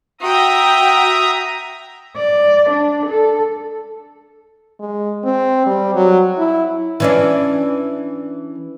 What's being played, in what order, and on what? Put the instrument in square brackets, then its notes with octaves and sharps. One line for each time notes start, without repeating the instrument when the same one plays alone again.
[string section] F#4 G5 [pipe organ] E5 A#5 D#6
[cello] D5
D4
A4
[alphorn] G#3
C4
G3
F#3
E4
[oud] E3 C#4 D4